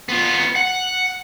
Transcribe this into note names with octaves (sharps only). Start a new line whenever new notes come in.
B3 F4
F#5